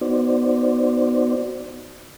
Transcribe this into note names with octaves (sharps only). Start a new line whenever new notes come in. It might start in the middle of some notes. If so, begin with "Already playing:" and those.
B3 D#4 F#4 C5 D5